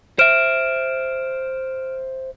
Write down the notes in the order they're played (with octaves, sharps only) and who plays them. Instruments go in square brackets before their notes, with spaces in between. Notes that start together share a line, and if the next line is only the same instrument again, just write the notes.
[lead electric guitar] C5 E5 [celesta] F6 D7 E7